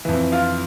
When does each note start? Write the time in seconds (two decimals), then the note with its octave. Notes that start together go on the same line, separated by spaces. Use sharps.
0.05 F2 E3
0.32 F4 F5